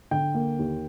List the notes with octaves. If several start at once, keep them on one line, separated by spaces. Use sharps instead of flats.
D3 G5
A#3
D#2